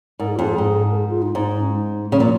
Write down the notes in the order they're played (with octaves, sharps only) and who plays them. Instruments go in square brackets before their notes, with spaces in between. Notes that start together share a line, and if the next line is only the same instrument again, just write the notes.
[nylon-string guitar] G#2 [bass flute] A#4
[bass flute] G#4
[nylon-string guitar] F2 [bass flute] F4
[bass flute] G#4
[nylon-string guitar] G#2
[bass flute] A#4
G#4
F4
D#4
[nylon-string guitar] G#2
[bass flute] D#4
C#4
G#3
[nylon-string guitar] C#3 [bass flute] F3
[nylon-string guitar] A#2